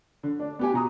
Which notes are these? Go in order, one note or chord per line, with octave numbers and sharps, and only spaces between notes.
D3
D4
B3 G4 G#5
B2 A#5 D#6